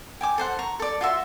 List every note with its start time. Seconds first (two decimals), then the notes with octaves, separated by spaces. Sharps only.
0.21 G5 G#5 D6
0.38 A4 C5 F#5
0.59 A#5 C#6
0.80 A4 D5
1.01 F4 F#4 E5 C6